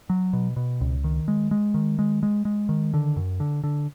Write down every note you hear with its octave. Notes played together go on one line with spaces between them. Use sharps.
F#3
B2
B2
C#2
D#3
G#3
G#3
D#3
G#3
G#3
G#3
D#3
D3
F#2
D3
D3